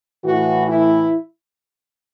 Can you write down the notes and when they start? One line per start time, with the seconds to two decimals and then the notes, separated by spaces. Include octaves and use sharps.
0.24 A2 E3 F#4
0.68 E4